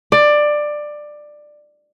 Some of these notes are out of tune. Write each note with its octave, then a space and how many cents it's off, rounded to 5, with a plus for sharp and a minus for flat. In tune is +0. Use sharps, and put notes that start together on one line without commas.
D5 +15